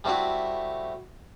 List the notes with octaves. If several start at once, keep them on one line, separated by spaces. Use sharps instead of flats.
G3 A3 C4 E4 F#4